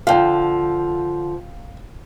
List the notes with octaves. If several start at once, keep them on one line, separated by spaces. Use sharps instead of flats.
D3 F3 F5 G5